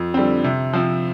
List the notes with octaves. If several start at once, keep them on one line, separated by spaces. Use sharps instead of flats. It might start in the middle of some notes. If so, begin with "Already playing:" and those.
Already playing: F2
D3 G3 C4
C3
F3 C4